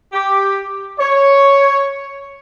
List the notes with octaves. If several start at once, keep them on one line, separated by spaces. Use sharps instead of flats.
G4
C#5